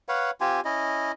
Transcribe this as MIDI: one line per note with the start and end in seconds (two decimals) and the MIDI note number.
0.09 0.31 71
0.09 0.31 73
0.09 0.31 77
0.09 0.31 78
0.41 0.60 60
0.41 0.60 65
0.41 0.60 67
0.41 0.60 80
0.65 1.12 61
0.65 1.12 64
0.65 1.12 75